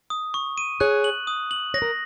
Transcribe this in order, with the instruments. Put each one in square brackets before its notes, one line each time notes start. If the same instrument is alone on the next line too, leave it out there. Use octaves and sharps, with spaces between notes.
[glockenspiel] D#6
C#6
D#7
[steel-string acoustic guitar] G#4 C#5 [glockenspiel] F#6
[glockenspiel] F#7
D#6
F#7
[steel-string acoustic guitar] C#5 [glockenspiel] A#6
[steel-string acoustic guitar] A#4